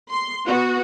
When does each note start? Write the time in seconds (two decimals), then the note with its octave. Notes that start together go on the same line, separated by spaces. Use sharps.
0.11 C6
0.47 B3 F#4